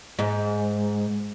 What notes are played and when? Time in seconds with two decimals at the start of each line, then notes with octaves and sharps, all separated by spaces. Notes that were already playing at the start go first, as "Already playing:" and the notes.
0.19 G#2